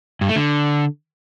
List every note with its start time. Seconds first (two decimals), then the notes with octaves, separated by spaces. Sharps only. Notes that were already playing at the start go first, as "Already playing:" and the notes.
0.21 G2
0.29 A3
0.36 D3